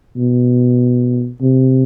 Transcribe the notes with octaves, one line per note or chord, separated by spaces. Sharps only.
B2
C3